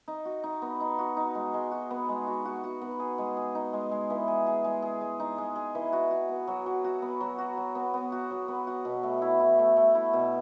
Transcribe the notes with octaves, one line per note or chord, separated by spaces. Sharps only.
D#4
F#4
D#4
B3
D#4
F#4
D#4
G#3
G#3
F#4
B3
G#3
F#4
F#4
F#4
B3
G#4
G#3
G#4
D#4
G#3
G#3
E3
G#4
G#4
G#3
G#4
G#3
D#4
G#3
G#4
E3
F#4
F#4
B3
F#3
F#3
F#4
B3
F#3
F#4
F#3
B3
B3
F#4
F#3
B3
F#4
B2
A3
E4
E4
A3
A3
E4
B2